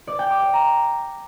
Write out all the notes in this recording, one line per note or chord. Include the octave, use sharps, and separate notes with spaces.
D5
G5
D6
D5
A#5